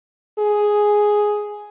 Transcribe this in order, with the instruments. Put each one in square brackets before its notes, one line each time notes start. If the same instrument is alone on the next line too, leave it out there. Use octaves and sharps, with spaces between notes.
[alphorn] G#4